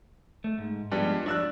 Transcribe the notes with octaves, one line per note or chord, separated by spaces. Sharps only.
A3
G#2
G2 F3 G#3 B3
F2 D4 F#4 D5 E6 F#6